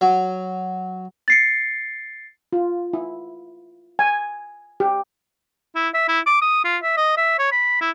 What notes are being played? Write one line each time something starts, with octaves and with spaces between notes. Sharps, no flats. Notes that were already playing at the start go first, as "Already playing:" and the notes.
F#3
A6 C7 C#7
F4
E4
G#5
G4
E4
E5
E4
D6
D#6
F4
E5
D#5
E5
C#5
B5
E4